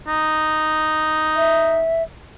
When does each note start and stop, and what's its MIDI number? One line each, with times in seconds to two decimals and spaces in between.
0.07 1.85 63
1.36 2.03 76